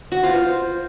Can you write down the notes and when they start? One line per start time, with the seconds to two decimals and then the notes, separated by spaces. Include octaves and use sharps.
0.12 F#4
0.23 F4 C5
0.31 B4
0.38 C5